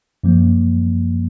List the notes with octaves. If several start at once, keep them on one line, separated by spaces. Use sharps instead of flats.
F#2 F3 A#3